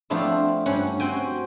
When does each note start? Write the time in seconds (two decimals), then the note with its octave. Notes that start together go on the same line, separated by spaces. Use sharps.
0.10 F3 A3 B3 C4 D4 E4
0.66 G2 C#4 F#5
1.00 C4 F#4 G5 G#5